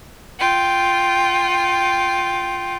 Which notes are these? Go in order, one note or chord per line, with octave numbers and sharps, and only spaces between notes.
F4 G5